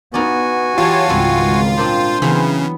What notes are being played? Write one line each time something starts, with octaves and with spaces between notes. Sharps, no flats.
B3 D#4 F4 F#4 D5 G#5
E3 F4 G4 C#5 A5
G#1 C#2 G3 C4 C#5
A#2 C4 D4 C5
C#3 E3 F#3 G3 B3